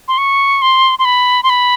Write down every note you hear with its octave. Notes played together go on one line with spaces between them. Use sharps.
C6
C#6
C6
C6
B5
C6
B5